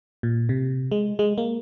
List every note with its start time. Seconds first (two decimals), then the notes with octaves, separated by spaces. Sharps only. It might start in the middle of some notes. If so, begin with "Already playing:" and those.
0.23 A#2
0.49 C3
0.91 G#3
1.19 G#3
1.38 A#3